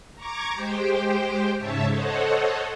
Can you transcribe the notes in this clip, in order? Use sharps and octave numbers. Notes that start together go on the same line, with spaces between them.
A#5 C#6 D6 G#6
G#3 G4 C5 G5
G#2 C#3 C#5 E5 A5
A4 C5 C#5 D#5 F#5